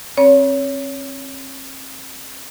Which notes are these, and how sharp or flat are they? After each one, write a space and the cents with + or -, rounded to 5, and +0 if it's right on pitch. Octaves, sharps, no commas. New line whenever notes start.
C4 +40 C#5 +20 B5 -45